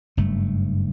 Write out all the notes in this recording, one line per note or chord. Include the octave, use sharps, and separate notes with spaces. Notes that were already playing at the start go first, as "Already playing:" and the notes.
F#1 G2 A3